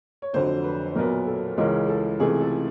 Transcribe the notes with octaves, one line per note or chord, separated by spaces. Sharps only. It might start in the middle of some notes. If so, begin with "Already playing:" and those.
C#5
F1 F2 D3 F#3 C5
B4
B1 A#2 F#3 B3 A#4
A4
C#2 C#3 E3 G#3 C#4 A#4
A4
C#2 C3 E3 A3 G#4
A4